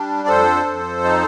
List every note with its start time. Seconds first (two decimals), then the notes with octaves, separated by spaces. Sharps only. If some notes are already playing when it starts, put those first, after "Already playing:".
Already playing: G3 D4
0.24 D5
0.28 F2 A4 C5
0.66 F2
1.04 D#4